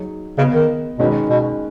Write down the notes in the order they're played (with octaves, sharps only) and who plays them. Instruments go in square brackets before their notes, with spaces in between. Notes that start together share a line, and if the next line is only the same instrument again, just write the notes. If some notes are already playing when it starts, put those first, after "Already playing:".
Already playing: [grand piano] F#3 D#4 G#4
[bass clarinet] C#3 [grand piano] B3 G#4 B4 D#5
[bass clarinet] D#3
[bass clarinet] B2 [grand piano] D#3 G#3 C#4 B4
[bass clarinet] B2